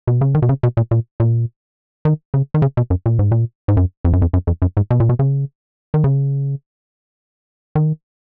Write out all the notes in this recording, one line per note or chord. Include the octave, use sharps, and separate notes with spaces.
B2
C#3
D#3
B2
C#3
B2
A#2
A#2
A#2
D#3
C#3
D#3
C#3
B2
F#2
A#2
G#2
A#2
G#2
F#2
F2
F#2
F2
F#2
F2
F#2
G#2
B2
A#2
B2
C#3
D#3
C#3
D#3